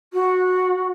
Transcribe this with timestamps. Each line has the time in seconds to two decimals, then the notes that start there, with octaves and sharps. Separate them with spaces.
0.13 F#4